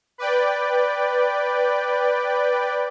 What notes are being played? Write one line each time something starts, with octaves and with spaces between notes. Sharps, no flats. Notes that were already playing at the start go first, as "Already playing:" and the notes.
B4 D5 G5